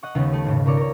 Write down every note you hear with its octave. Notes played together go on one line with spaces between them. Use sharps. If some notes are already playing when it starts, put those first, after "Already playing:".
D#5 F#5 C#6
D#2 C#3 G3 B3
A3 D#5
B1 G#2 C#3
C#2 A#3 A#4 C#5 D5 C#7
A#4 C#5